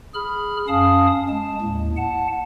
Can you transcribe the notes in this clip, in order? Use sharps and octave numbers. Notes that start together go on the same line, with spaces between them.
G#4 B5 F6
F#2 C#4 F5 A5 D#6
G#3 A5
D#2 A2
F#5 A5